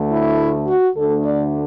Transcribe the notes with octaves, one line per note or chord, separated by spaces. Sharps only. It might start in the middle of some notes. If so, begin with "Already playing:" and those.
Already playing: D2 D3 A3
E4
F#4
D2 D3 A3 D4 A4
D5